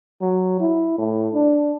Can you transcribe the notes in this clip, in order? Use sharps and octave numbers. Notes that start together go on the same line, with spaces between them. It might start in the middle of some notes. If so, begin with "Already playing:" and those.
F#3
E4
A2
D4